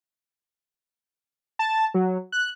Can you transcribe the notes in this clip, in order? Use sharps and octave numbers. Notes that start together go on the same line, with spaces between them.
A5
F#3
F#6